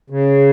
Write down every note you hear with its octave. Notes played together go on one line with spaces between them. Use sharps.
C#3